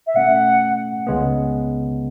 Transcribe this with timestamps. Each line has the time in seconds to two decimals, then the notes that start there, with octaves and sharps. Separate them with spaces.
0.06 E5
0.14 B2 A3 C#4 F#5
1.07 C#2 C#3 G#3 B3